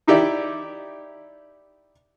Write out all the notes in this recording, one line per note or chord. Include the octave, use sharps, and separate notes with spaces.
D#4 E4 G4 D5 E5